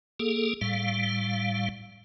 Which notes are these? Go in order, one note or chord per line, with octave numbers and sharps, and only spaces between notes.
A#3 G#4 A4
A2 G3 F5